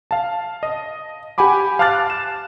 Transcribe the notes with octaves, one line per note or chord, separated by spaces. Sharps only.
F5 A5
D#5
G4 F#5 G#5 B5 D6
F5 A5 D6 F6 F#6 A6
F#6 E7